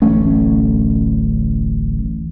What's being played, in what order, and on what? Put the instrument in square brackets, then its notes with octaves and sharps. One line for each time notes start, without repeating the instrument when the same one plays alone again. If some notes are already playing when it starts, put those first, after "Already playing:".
[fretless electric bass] D1 A1 A3 C#4